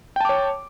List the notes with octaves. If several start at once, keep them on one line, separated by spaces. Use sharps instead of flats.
C#5 G5 A5 D6